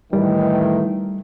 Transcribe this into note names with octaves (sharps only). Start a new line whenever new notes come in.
A2 D#3 E3 G3